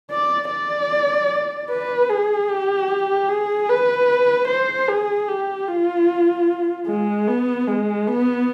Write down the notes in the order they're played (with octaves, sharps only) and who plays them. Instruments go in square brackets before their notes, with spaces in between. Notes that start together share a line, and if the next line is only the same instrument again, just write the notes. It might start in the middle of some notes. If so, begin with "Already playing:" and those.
[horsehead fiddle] D5
D5
B4
G#4
G4
G#4
B4
C5
G#4
G4
F4
G#3
B3
G#3
B3